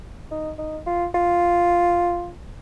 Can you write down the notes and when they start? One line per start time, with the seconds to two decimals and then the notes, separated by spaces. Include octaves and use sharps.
0.31 D#4
0.59 D#4
0.86 F4
1.15 F4